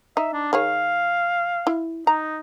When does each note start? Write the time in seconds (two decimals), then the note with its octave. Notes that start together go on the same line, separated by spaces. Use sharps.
0.17 D#4 E5
0.33 D4
0.53 D#3 G#4 C#5 F5
1.67 E4
2.07 D#4 A#5